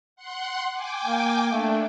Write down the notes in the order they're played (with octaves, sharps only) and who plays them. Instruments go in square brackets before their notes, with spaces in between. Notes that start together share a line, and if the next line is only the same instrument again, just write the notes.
[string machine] F#5 C6 F#6
G5 G#5 D6
[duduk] A#3
[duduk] A3 [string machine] D4